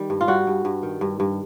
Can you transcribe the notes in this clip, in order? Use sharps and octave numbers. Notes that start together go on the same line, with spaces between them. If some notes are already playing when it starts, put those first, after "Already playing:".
Already playing: D#3 G3
G2
F4
G3 F#4
G2
G2
D#3
G2
G2